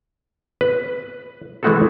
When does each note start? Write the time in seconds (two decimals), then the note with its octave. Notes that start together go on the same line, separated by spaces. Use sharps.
0.61 B4
1.63 E3 G#3 A3 F#4 G#4 A4